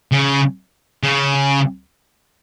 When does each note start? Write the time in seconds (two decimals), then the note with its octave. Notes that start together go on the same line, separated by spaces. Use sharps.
0.12 C#3
1.03 C#3